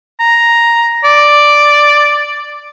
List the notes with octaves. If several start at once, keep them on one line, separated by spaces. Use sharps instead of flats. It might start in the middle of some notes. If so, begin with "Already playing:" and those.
A#5
D5